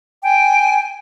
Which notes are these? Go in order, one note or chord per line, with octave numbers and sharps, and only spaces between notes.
G5 G#5